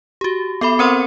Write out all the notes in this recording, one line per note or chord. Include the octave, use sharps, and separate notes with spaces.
F#4 G4
B3 A4 E5 B5
C4 A#4 C5 F#5 B5 C6